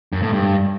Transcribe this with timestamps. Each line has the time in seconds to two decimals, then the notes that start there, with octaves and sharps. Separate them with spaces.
0.12 F#2
0.23 A2
0.33 G2